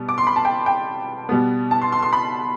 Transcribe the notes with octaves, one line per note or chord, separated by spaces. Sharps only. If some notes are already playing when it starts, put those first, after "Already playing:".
Already playing: B2 G3 B3
D6
C6
B5
A5
G5
G5
B2 G3 B3
A5
C6
C6
C6
B5